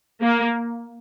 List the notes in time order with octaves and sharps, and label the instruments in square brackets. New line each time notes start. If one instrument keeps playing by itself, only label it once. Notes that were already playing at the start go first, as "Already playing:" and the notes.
[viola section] A#3